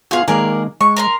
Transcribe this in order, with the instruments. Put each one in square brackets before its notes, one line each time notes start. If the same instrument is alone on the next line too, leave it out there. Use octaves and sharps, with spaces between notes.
[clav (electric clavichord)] B3 F4 F#4 [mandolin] G#4 F5
[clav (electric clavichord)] D#3 G#3 A#3 [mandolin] G#4 A#4 D5
[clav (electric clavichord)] G#3 [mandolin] C#6
[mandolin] A#4 A#5 C6